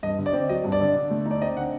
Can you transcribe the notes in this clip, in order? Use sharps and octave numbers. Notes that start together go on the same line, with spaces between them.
G2 D#5
D3
D5
C4
F#3 D#5
G2
D5
D3
D3
A3
D#4
D5
C4 D#5
D3 F#5